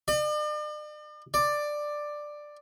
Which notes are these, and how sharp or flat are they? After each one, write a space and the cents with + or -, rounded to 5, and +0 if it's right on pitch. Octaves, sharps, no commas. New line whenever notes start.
D5 +45
D5 +10